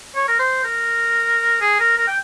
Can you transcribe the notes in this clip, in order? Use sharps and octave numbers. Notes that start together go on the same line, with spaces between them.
C#5
A#4
C5
A#4
G#4
A#4
A#4
G5